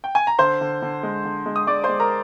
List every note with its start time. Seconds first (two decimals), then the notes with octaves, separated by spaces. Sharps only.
0.04 G5
0.15 G#5
0.27 A#5
0.39 D3 C5 C6
0.61 D3
0.82 D3
1.03 G#3
1.25 D3
1.46 G#3
1.56 D#6
1.67 G#3 D5 D6
1.84 G#3 C5 C6
2.00 A#4 A#5